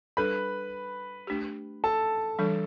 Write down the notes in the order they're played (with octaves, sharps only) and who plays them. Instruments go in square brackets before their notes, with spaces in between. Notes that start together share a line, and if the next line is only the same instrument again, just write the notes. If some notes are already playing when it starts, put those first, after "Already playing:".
[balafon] G3 D4 A4 [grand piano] B4 B5
[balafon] A3 D4 G4
[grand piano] A4 A5
[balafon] E3 G3 D4 A4